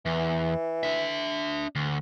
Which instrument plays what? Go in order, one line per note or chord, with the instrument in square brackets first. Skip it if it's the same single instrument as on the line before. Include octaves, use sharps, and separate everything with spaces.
[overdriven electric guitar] E2 [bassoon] E3
[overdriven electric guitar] D4 E5
D2